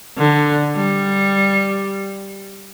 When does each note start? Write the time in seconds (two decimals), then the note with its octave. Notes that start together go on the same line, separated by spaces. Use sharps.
0.17 D3
0.75 G3